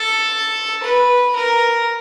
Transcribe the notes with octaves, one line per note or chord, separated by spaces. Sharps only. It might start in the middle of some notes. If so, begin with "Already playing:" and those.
Already playing: A4
B4
A#4